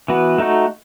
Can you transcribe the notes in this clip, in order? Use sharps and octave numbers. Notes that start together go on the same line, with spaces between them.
E3 B3 F#4 B4
A3 D#4 F#4